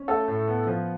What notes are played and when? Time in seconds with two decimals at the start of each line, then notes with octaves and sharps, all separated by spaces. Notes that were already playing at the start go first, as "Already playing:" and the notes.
Already playing: C#4
0.08 A3 A4
0.28 A2
0.48 B3
0.67 F3